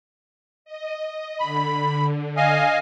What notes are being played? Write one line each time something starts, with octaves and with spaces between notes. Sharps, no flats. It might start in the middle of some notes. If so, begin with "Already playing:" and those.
D#5
D3 B5
D#5 F5 G#5